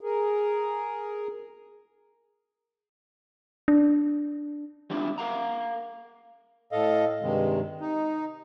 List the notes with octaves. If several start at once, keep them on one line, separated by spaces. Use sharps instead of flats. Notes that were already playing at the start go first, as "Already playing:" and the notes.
G#4 A#4
D4
G3 B3 C4 D4 E4 F4
A#4 F5 F#5 A#5
A2 A4 D#5 F5
G2 C3 D#3 G#3
D#4